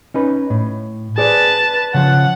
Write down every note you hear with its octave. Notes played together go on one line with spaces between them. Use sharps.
C#4 D#4 B4
A2
G#4 B4 C5 D5 A5
C#3 F3 F#5